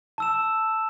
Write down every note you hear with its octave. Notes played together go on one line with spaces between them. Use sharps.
A5 E6 E7